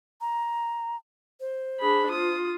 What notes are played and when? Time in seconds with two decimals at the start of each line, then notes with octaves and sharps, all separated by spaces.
0.21 A#5
1.40 C5
1.80 D4 G#4 B5
2.11 F4 D#6